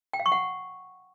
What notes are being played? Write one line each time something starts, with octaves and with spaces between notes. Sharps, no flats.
G5
F5
C#6
F#5